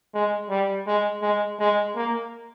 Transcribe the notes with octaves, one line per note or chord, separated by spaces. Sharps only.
G#3
G3
G#3
G#3
G#3
A#3